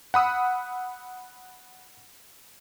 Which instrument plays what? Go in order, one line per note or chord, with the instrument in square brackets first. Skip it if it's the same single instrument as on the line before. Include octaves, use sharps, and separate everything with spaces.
[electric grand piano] F#5 B5 D#6 E6